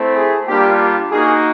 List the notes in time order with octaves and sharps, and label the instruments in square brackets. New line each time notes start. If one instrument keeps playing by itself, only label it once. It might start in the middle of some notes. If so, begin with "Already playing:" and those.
Already playing: [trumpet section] A3 C4 E4
G#4
G3 A#3 D4 F4 G4
G4
A#3 D#4 F#4 G#4